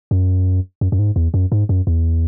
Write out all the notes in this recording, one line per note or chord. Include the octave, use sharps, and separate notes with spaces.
F#2
F#2
F#2
G#2
E2
F#2
G#2
F#2
E2